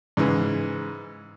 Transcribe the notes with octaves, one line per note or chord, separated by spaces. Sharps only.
G#2 C#3 E3